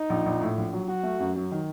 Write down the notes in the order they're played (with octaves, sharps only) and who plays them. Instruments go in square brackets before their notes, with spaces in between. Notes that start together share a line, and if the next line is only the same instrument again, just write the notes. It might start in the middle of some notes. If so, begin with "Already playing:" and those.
Already playing: [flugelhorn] D#4
[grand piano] A#1
A#1
A2
A#1
F#3
[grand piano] F#3 [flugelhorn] F#4
[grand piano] A3
F#2
F#3
D#3